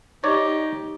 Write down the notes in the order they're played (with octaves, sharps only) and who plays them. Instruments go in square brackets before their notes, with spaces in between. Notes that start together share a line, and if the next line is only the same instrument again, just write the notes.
[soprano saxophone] D#4 [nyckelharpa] G4 [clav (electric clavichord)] C#5 D5